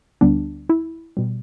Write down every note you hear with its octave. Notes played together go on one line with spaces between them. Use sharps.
D2 D3 G3 B3 D4
E4
B2 G3